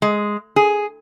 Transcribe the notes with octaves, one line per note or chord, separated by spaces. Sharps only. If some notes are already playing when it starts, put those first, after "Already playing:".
G#3
G#4